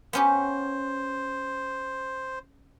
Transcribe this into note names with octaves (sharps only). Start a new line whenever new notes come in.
B3 C#4 G4 C5